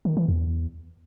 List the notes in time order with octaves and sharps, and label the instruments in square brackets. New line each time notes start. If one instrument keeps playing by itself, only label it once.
[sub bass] D#3
E3
E2